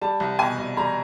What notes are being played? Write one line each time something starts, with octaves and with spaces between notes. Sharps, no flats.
G3 A5
C2
B2 G#5
C2
G3 A#5